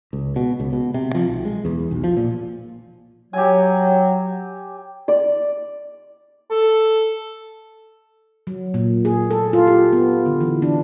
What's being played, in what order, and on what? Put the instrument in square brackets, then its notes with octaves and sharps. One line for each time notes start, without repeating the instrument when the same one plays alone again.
[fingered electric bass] C#2
B2
C#2
B2
C3
F3
B1
G#3
E2
B1
F3
A#2
[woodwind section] F#3 [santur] G4 G#5
[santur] D5
[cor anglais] A4
[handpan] F#3
A#2
G#4
A4
F4
G4
B3
D3
E3
D4